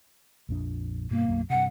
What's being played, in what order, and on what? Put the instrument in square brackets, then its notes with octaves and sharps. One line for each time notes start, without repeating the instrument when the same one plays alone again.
[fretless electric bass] A#1 F2 D4
[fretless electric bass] G2 B2 [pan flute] A#3
[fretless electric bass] B1 F#2
[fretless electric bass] G2 C3 [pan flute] F#5